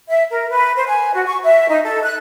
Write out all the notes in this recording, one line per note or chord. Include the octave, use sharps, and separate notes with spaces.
E5
A#4
B4
C5
G#5
F#4
C#6
E5
D#4
A4
F#6